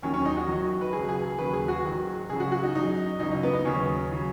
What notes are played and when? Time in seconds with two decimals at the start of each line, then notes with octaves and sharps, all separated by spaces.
0.02 D#2 D#3 F#3 C#4
0.14 C#4
0.25 D#4
0.37 F#4
0.48 F#2 D#3 F#3
0.81 B4
0.93 C#2 C#3 F#3 G#4
1.09 G#4
1.23 G#4
1.38 D#2 C#3 F#3 B4
1.53 G#4
1.68 F#4
1.84 G#2 D#3 F#3
2.29 C#2 C#3 F#3 G#4
2.40 F#4
2.52 F#4
2.63 D#4
2.74 F#2 F#3 D#4
3.19 C#2 C#3 F#3 D#4
3.31 D#4
3.43 B3
3.54 D#4
3.65 D#2 C#3 F#3 C#4
4.12 C#3 F#3